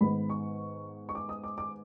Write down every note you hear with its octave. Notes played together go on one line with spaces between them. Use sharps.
G#2 D#3 G#3 B3 B5
C#6
C#6
D6
D#6
D6
D6